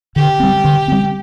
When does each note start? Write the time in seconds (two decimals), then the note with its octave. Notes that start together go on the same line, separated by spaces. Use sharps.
0.16 D3 G4
0.40 G3 C4
0.64 D3
0.88 G3 C4